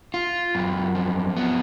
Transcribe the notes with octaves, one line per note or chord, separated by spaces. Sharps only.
F4
F#2
F3
B3